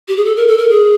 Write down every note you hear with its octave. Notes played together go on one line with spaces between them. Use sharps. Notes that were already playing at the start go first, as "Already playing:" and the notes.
G4
G#4
A4
A#4
A4
A#4
G#4